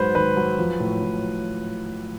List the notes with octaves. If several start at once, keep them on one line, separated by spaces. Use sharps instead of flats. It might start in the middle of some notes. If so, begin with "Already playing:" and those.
Already playing: G#2 F#3 B4 C5
D#3 B4
F#3
F3
A2
A2